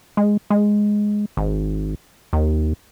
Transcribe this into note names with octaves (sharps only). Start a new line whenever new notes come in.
G#3
G#3
G#1
D#2